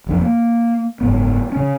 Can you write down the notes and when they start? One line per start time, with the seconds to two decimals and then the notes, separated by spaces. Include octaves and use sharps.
0.06 E1 F2 D3
0.21 A#3
1.01 F#1 G#2 B3
1.52 C#3 C#4